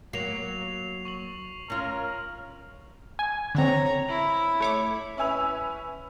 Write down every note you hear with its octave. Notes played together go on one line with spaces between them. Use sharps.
F#3 A#3 C7 F7
C#6 F7 F#7
C#4 F4 A#4
G#5
D3 C4 C#5 A#5
E4
A3 C#5 D6
C#4 E4 B4 G#5 E6 F7